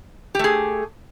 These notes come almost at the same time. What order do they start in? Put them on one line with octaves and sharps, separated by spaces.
G4 A3 G#4